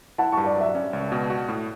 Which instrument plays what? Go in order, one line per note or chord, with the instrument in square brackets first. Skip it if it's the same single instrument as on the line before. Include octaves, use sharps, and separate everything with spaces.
[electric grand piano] E4 [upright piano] F#5 A5
[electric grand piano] G2 [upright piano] A5 C#6
[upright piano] D5
[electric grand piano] F#3 [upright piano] E5
[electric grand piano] C#4
C#2
B2
F#4
A2